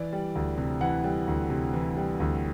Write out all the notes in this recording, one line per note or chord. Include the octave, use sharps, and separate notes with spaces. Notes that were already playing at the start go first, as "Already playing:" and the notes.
Already playing: E3 D5
G3
D2
C3
E3 F#5
G3
D2
C3
E3
G3
D2